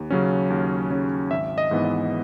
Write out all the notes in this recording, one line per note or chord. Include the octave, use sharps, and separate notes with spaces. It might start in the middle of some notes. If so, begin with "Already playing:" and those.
Already playing: D#2
C#3 F#3 C#4
D#2
C#3 F#3 C#4
G#1 E5
D#5
G#2 E3 B3
D#5